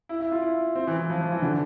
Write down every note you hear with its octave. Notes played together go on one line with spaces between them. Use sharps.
E4
E4
F4
E4
C4
E3
E3
F3
F3
E3
D3